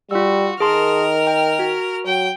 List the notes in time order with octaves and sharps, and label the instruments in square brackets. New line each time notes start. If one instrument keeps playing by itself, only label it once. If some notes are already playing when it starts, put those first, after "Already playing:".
[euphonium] G3 [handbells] F4 E6 [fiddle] F#4
[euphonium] D#3 [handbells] G#4 A5 C6 [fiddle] A#4 F6
[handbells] G5
F#4
[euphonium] F#3 [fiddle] G5